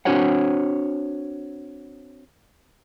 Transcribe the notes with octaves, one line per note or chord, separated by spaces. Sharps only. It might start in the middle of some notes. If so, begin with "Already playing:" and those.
C4 D4 F#4 C5 C#5 F#5